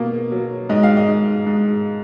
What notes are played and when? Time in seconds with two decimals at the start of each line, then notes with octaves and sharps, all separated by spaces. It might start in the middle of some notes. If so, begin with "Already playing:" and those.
Already playing: B2 A#3
0.32 F#3
0.69 G#2 D#5
0.83 F5
0.97 D#5
1.08 G#2
1.47 G#2